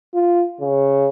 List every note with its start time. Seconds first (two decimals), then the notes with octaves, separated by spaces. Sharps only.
0.14 F4
0.61 C#3